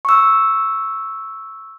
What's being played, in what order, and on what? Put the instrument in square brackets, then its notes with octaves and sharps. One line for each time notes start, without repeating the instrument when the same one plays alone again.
[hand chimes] C#6 E6